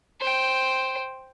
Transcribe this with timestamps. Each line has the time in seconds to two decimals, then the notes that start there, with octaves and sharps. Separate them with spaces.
0.20 C5 G5